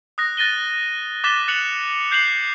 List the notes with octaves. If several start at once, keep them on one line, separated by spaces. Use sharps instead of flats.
D#6 F#6 A#6
F#6 A6 A#6 D#7 G7
D6 F#6 A6 B6 E7 G7
F#6 A6 C#7 F7 F#7
F#6 G6 C7 C#7 F7 F#7